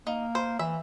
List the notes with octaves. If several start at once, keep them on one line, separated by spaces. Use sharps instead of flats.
A#3 D#4
C5
E3 E5